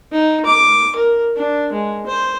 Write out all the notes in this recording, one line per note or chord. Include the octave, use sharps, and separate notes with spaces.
D#4
D6
A#4
D4
G#3
C5